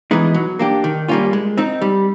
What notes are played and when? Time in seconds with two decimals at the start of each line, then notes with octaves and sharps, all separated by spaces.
0.11 E3 G#3 B3 D#4
0.34 F#3
0.59 A#3 D4 G4
0.84 D#3
1.08 G3 A#3 C#4 F4
1.33 G#3
1.57 C4 D#4
1.81 G3